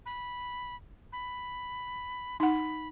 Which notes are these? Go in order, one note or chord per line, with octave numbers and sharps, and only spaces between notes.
B5
B5
D#4 F#5 B5